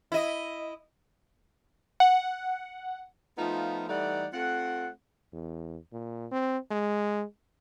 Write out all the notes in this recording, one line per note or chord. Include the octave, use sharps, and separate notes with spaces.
E4 D#5
F#5
F3 A3 B3 D#4 F4
E3 G3 A3 D#4 D5 F#5
A3 C4 F4 F#5
E2
A#2
C4
G#3